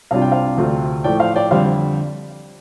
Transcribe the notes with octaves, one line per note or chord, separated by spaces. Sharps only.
C2 C3 G3 D4 F4 F5
G5
C5 F5
D2 C3 A3 C4 F4
A2 F3 A3 D5 G5
C5 F5
D5 G5
F2 D3 G3 C5 F5